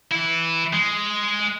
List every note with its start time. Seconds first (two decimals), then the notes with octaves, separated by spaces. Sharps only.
0.11 E3 E4
0.73 G#3